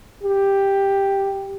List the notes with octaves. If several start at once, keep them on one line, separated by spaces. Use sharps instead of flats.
G4